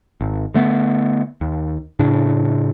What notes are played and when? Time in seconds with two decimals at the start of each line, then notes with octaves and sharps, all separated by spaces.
0.21 G#1
0.54 D3 A3 B3
1.41 D#2
1.99 A2 C#3 D4